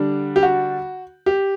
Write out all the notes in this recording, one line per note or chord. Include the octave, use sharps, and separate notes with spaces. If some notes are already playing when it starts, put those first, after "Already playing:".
Already playing: D3 G3 D4
G4
F#4
G4